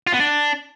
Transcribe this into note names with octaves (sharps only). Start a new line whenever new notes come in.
F4
B3
D4